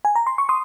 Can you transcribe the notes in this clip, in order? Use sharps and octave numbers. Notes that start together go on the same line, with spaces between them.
G#5
A#5
C6
C#6
C6 D#6